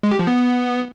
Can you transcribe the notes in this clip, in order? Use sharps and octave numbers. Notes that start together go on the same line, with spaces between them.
G#3
G4
F3
B3